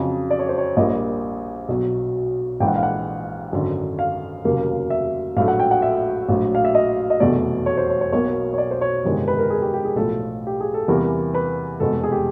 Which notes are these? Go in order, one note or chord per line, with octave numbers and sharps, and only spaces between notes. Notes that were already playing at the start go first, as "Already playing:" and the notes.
Already playing: F2 C#3 F#3
D5
C#5
C5
C#5
A#1 A#2 G3 A#3 D#5
B1 B2 F#3
A#1 G#2 E3 G5
F#5
F5
F#5
G#1 F#2 D3
F5
F1 D#2 C#3 F#3 A#3
E5
A#1 A2 F#3 A3 F5
F#5
G5
F#5
E5
A#1 A2 F#3
F5
E5
D#5
D#5
F1 E2 B2 F#3 A3 D5
C#5
C5
C#5
C#5
B1 B2 F#3 A#3 C#5
C#5
D5
C5
C#5
G1 F2 C3 D#3 G#3
B4
A#4
G#4
G4
G4
G#4
B1 A2 F3 A4
G4
G#4
A4
E2 C3 E3 G3 A#3 A#4
B4
F1 E2 B2 G#3 A4
G#4
G4